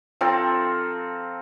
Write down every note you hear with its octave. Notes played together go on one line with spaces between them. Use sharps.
F3 C4 A4 A#4